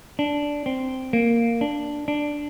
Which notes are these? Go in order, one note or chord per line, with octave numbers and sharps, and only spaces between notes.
D4
C4
A#3
D4
D4